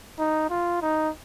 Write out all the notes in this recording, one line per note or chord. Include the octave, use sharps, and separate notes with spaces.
D#4
F4
D#4